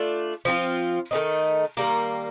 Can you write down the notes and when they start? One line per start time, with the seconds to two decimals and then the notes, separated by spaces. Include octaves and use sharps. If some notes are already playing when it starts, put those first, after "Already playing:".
Already playing: A3 D4 F4
0.45 F3 C4 F4
1.11 D#3 A3 C4 D#4
1.77 D#3 G3 A#3